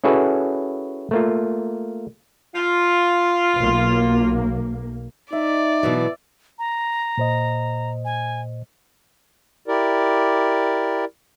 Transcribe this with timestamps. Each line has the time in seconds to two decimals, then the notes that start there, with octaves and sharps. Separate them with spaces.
0.04 C#4 E4 F#4 G#4 A4 B4
1.11 A3 A#3 F4
2.55 F4
3.57 B1 A#3
5.33 D#4 D5 E5
5.83 B2 E3 F#3
6.59 A#5
7.18 A#2 C5 D#5
8.05 G#5
9.68 E4 G4 A#4 D5